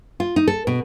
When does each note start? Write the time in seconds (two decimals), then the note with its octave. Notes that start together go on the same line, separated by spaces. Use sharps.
0.20 F4
0.36 D#4
0.48 A4
0.67 B2